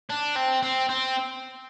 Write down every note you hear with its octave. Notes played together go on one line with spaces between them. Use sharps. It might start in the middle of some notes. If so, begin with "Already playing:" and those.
D4
C4
C4
C4